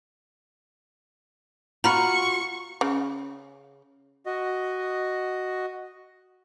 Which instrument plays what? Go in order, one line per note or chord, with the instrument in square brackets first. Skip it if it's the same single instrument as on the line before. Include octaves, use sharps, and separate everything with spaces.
[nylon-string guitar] F4 F#4 [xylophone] A#5 B5 F6 [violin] C#6
[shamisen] C#3
[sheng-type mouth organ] F#4 D#5